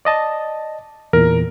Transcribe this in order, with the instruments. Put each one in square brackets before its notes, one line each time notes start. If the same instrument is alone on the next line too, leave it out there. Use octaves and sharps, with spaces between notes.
[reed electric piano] D5 D#5 A5
[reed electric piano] E2 A#2 [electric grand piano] A#4